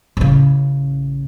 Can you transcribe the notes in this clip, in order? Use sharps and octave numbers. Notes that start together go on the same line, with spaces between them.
A1 C#3